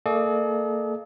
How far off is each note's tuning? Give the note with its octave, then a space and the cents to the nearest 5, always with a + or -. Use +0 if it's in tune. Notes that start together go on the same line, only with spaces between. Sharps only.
A#3 -35 A4 -45 D5 +45